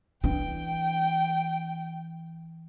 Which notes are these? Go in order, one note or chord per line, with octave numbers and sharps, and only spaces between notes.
E3 D4 G5